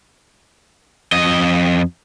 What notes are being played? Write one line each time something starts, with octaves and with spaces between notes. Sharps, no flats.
F2 D#5